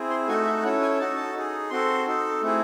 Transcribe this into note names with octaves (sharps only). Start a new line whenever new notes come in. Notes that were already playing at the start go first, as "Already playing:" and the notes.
Already playing: C4 E4 G#4
C6
A3 D#4 F#4 A4 G#5
E5
C#4 E4 A4 F#5
G#5
D#4 F#4 A4 A5
A5
D#4 G#4
C4 F#4 A4 C6
D#4 A4
A3 C4 E4 G#4